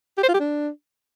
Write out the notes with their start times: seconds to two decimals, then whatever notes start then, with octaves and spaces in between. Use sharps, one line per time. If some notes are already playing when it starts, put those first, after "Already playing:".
0.17 G4
0.23 C5
0.28 F4
0.34 G4
0.40 D4